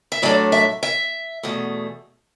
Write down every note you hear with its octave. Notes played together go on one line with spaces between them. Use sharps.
E5
A2 F#3 A3 D4 D5
E5
E5
E2 B2 A3